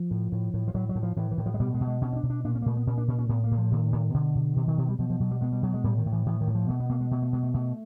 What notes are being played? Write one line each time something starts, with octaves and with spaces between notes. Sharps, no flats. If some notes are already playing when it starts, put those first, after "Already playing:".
Already playing: F3
A2
A2
A2
F3
A2 F#3
F#3
A2
F3
A2 E3
E3
A2
F3
G#3
B2 G3
G#3
B2
G#3
B2 C#4
C#4
D4
B2
D4
A#2 D4
C#4
A#3
A#2 A3
B3
A#2 C#4
D4
A#2 C#4
C#4
A2 B3
A#3
A2
F3
A2 D#3
A2
B2 D3
B2
B2 D#3
D#3
B2 D#3
G3
B2 F3
F3
B2 F#3
G3
B2 G#3
G3
B2 F#3
G#3
A2 G3
D#3
A2
E3
A2 E3
D#3
A2
F3
B2 A3
B3
B2 A#3
G#3
B2 A3
A3
B2 G#3
A3
B2 A3